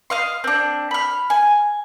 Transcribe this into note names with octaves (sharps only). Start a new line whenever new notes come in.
D#5 F5 C6
C4 D4
B5 F6
G#5